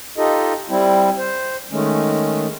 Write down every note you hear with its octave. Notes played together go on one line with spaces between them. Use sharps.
D#4 F4 G4 A4 D#5
G3 C4 E4
C5
D#3 G#3 A3 C#4